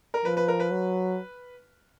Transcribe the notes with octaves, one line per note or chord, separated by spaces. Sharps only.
A#4
F3 B4
B4
A#4
B4
F#3